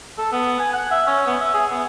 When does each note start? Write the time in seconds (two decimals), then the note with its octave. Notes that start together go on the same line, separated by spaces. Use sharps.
0.18 A4
0.32 B3
0.59 G#5
0.73 F#5
0.91 E5
1.07 C#4
1.26 B3
1.40 E5
1.54 G#4
1.71 B3